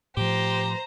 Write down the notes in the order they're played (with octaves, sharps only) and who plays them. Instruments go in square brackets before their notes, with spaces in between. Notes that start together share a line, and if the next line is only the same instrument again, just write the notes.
[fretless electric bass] A2 F3 [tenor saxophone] G4 [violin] C5 A#5